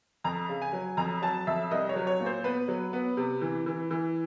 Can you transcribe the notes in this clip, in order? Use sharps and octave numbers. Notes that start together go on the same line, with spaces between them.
F2 A#5
C#3
G#5
F#3
F2 A#5
F#3 A5
F2 E5
C2 D#5
C#5
F#3
C#5
A#2
C5
B3 B4
F#3
B3
C3
E3
E3
E3